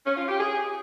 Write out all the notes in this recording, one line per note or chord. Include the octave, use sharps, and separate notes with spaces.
C#4
F4
G4
G#4